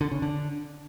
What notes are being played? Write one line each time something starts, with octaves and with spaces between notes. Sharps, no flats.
D3
C#3
D3